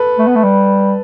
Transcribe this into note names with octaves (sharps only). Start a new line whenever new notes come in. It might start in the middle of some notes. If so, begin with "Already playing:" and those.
Already playing: A4 B4
A3
B3
A3
G3